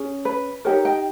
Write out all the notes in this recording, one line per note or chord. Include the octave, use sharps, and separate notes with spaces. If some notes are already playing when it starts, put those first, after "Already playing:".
Already playing: C#4 G#4
B4
D#4 G4 A#4 C#5
D#5 G5